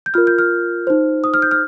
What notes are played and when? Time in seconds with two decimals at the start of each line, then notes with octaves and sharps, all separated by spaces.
0.06 G6
0.14 F4 A#4 F6
0.27 G6
0.38 F6
0.87 D#4 C5
1.24 D#6
1.34 F6
1.42 G6
1.51 F6